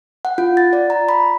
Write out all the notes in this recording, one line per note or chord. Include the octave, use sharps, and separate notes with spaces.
F#5
F4
A6
D5
A#5
B5